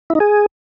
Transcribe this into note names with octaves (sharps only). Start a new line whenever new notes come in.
E4
D#4
G#4